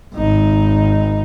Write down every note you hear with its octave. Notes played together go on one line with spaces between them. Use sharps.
G#1 D#4